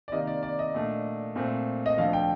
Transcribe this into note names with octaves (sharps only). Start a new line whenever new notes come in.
D5
C3 D#3 A#3 D#5
D5
D5
D#5
A#2 A3 D4
A#2 A3 C4
D#5
D2 D3 F3 F5
G5